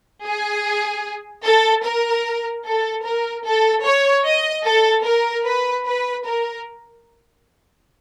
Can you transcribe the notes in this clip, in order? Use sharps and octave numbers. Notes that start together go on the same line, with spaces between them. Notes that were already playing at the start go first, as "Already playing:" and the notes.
G#4
A4
A#4
A4
A#4
A4
C#5
D#5
A4
A#4
B4
B4
A#4